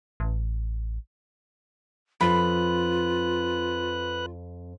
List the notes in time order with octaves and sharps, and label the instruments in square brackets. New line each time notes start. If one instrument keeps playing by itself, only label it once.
[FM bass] A1
[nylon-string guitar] F2 [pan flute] F4 [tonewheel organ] B4 F#6 [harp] B5